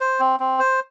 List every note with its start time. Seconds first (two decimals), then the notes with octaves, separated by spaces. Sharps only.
0.01 C5
0.20 C4
0.40 C4
0.60 C5